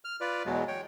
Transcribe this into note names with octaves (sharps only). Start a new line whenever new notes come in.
F6
F4 B4 D5
E2 B2 F#3 G#3
C#5 G5